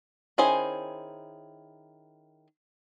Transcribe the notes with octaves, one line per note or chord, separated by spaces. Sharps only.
D#3 C#4 E4 G#4 C5